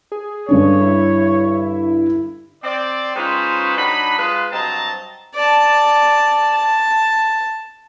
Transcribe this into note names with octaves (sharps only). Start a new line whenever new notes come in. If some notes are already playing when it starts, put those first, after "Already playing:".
G#4
G2 D3 D4 C#5
E4
C4 D5
G#3 C#4 D#4 F4 B4 C5
F#3 D4 D#4 B5
G#3 F4 G#4 B4
G2 F#3 C4 D#5 A5 A#5
D5 A5
A5